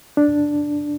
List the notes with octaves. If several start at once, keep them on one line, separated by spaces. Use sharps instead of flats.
D4